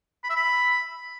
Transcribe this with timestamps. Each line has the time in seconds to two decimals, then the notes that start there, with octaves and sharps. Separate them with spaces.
0.24 B5
0.30 E5
0.36 B5